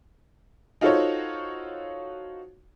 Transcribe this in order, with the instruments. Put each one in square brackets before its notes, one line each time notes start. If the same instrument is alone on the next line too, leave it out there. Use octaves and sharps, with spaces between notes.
[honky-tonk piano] D#4 F4 F#4 A4 C5 C#5